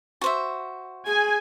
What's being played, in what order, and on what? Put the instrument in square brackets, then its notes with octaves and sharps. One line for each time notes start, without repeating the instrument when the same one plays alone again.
[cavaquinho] F#4 C5 E5
[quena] G#4 [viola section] G#5